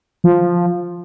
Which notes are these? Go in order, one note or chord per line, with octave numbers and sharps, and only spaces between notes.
F3